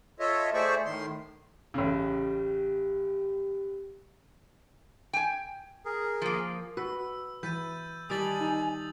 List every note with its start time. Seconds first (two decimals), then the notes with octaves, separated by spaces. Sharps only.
0.20 F4 A4 C#5 D#5 E5
0.54 A3 G#4 C5 D5 E5 C#6
0.86 A2 D#3 C6
1.74 A1 C#3 G4
5.13 G5 G#5
5.86 G#4 A#4
6.22 F3 A#3
6.77 F#4 B4 E6
7.43 E3 B4 G6 A6 D#7
8.10 D#3 G3 D4 G#5 D#6 A6 F#7
8.41 D#4